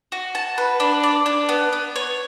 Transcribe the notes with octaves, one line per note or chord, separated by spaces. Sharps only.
F#4
A5
B4
D4
D5
D4
B3
B3
C#5